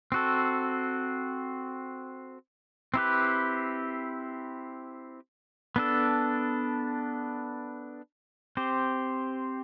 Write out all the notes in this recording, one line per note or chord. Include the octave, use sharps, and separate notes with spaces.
C4 F#4 A4
C4 E4 G4 B4
B3 D4 A4
C4 G4 C5